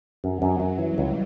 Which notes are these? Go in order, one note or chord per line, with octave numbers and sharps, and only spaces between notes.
F#2 F#3
F#2
F#2
E3 G3
C#2